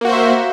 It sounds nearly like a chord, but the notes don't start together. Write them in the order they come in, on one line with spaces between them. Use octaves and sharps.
A#3 F#4 C5 E5